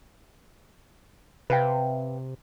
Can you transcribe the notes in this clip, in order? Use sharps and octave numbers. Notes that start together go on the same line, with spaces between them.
C3 B4 F5 G5